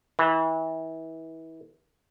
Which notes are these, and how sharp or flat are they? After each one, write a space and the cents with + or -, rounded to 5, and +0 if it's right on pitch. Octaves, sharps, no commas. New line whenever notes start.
E3 -30